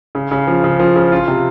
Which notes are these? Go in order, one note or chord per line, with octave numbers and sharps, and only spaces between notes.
C#3
C#3
F3
C#3
F3
C#3
F4
C3